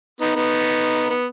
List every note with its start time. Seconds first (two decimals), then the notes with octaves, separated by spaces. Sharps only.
0.21 B3 D#4
0.36 B3 D#4
1.10 B3